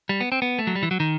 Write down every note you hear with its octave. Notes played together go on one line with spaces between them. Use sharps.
G3
B3
C4
B3
A3
F#3
G3
E3
F#3
D#3